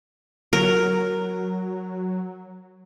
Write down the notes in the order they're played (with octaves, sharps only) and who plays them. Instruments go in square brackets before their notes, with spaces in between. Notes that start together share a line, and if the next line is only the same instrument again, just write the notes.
[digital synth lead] F#3 [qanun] A#4